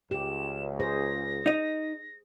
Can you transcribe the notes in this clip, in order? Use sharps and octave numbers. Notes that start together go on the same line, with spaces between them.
C#2 G4 E7
G#4 C5 A#6
D#4 D#5